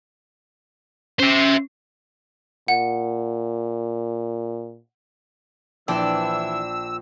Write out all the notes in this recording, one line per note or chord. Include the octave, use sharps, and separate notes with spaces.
C#4 C5 E5
A#2 F#5
A#1 E3 D4 E4 G5 E6